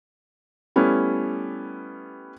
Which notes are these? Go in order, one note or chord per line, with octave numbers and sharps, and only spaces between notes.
G3 A3 B3 C#4 E4